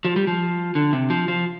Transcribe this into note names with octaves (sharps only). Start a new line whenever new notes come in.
F3
G3
F3
D3
C3
F3
F3